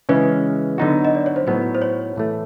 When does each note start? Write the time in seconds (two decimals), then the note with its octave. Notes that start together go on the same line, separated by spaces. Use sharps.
0.09 C#3 E3 G#3 C#4 B4
0.78 D3 F#3 B3 D#4 F#4
1.05 D#5
1.15 D5
1.26 C#5
1.36 C5
1.47 A2 F#3 B3 D#4 B4
1.75 C5
1.82 C#5
2.16 A2 E3 A3